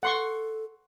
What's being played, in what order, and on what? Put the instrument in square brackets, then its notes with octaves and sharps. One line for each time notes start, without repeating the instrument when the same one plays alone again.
[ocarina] A4 [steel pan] F#5 C6 C#6